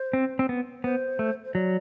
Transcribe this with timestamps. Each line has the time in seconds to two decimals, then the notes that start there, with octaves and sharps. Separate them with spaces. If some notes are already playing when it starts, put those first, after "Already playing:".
Already playing: C5
0.13 C4
0.39 C4
0.49 B3
0.84 B3 C5
1.19 A3
1.45 C5
1.54 F#3 D5